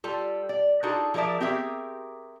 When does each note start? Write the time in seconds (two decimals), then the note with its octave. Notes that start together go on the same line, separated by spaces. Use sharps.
0.04 G3 F4 A4
0.49 D5
0.83 D4 D#4 F4 F#4 G#4 A4
1.14 F3 G#4 A#4 D5 E5
1.40 C4 G4 G#4 A#4 E5